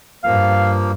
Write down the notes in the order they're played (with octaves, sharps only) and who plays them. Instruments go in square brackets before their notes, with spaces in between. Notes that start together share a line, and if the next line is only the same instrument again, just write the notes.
[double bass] G2 [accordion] F3 A#3 [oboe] F5